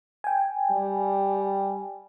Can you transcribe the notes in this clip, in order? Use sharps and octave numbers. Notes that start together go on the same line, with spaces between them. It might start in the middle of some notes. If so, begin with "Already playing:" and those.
G5 G#5
G3